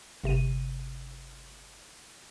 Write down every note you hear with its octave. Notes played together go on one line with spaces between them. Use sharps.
G1 C3 D#7